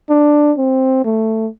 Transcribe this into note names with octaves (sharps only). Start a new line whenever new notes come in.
D4
C4
A3